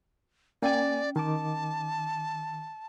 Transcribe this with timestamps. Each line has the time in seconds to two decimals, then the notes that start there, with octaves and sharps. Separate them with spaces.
0.62 A#3 C#4 D5 G5 G#5
1.16 D#3 A5 D6